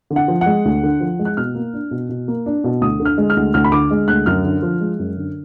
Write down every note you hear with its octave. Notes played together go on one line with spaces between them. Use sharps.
D3
F#5
F3
G#3 F#5
D2
D3
F3
G#3
F#6
B2 F6
A#3
D4
B2
B2
A#3
D4
B2
D2 D#6
D3
F6
G#3
F6
D2
D2 F6
B5
D3 D6
G#3
D2 F#6
F#2 F6
D3
F3
G#3
F#2
D3